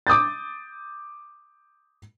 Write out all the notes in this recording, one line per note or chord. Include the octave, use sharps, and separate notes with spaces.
D6 D#6 G6 A6